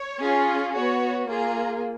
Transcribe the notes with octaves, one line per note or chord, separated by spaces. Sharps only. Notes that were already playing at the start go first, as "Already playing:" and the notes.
Already playing: C#5
C#4 F4 G#4
B3 F#4 C#5
A#3 F4 G#4 A#5